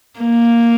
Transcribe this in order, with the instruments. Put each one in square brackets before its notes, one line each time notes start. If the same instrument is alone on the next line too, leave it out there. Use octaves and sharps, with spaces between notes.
[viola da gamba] A#3